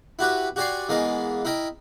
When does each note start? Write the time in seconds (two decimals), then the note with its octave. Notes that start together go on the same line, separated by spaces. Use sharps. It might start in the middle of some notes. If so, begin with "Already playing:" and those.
0.19 E4 F#4 G4 B4
0.56 F#4 G4 D5 G#5 C6
0.89 E3 G#3 A#3 B3 A#4
1.45 E4 A#4 D#5 G5